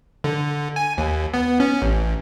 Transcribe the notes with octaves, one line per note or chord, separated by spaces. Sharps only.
D3
G#5
D#2
B3
C#4
A1